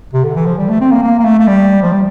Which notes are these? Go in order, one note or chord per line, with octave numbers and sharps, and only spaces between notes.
C3
D3
E3
F3
G3
A3
C4
A#3
A#3
A#3
A3
A3
G3
F3
G3